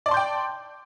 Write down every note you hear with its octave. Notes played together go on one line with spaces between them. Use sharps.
D5 G5 A5 C6 G6